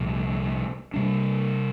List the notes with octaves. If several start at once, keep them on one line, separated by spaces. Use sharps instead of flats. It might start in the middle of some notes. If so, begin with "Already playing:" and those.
Already playing: C2 A#2 F3 A3
C3 G3 D4